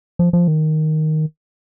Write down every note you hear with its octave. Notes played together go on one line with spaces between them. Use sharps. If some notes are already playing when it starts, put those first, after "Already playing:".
F3
F3
D#3